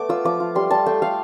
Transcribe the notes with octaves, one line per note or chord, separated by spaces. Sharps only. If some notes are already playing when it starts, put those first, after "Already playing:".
Already playing: A3 B3 D6
F4 E6
F3 D6
F4
G3 C6
G3 A5
A3 G5
A3 F5